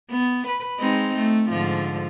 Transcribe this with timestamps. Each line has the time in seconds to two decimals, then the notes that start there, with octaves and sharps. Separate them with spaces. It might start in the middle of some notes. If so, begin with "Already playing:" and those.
0.11 B3
0.47 B4
0.80 G#3 C4 D#4
1.16 A3
1.51 G#2 D3 F3